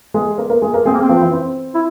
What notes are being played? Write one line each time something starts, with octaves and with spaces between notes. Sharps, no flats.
G#3 G#4
A#3 A#4
A#3 A#4
G#3 G#4
A#3 A#4
G#3 C4 G#4
A#3
C4
F3 F4
E3 E4
C4
E4